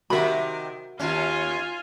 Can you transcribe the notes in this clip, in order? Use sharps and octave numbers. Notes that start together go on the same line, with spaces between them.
C3 D#3 F#4 A#4 E5 B5
D#2 C#4 F4 G#5